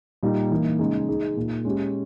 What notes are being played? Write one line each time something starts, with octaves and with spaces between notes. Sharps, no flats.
A#2 G3 A#3 D#4
E3 A#3 D#4
C#3 G#3 D#4 G#4
G#3 D#4 G#4
A#2 A#3 D#4
G#3 C#4 G4